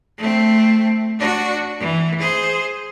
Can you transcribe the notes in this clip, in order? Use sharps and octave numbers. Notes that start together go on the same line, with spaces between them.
A3 C4
D4 F#4
E3
G#4 C5